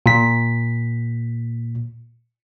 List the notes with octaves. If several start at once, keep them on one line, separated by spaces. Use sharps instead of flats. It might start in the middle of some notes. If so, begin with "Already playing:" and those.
A#2 B6